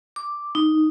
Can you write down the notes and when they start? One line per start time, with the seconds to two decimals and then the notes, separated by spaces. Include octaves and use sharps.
0.16 D6
0.55 D#4